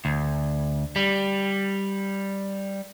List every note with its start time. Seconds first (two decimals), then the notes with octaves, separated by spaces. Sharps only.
0.05 D2
0.96 G3